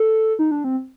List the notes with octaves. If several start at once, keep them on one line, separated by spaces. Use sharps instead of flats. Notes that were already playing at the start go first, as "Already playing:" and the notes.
Already playing: A4
D#4
D4
C4